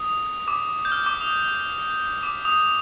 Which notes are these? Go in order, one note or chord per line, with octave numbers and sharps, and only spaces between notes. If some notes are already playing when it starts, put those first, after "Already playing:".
Already playing: D#6
D6
G6
F6
D6
D#6
D6
D#6